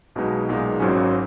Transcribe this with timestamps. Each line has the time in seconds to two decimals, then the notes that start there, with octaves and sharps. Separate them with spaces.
0.15 B1 B2 G#3 B3 D#4
0.48 B1 A#2 G#3 B3 D#4
0.80 G#1 G#2 D#3 F#3 C#4